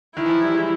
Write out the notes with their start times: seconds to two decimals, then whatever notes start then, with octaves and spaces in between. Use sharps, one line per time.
0.17 D#3 E4
0.25 E3
0.29 F3
0.42 G3
0.54 G#3